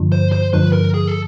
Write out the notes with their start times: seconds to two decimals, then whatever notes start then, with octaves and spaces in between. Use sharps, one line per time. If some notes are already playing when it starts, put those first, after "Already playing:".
Already playing: G2 D3 F3
0.12 C5
0.32 C5
0.53 G2 D3 F3 B4
0.73 A#4
0.94 G#4
1.08 A4